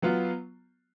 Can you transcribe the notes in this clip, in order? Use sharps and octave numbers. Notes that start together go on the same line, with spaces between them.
F#3 B3 F4